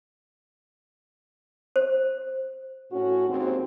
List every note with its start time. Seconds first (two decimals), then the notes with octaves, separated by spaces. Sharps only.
1.76 C5
2.91 A2 C#4 F#4
3.29 D#2 G#2 C4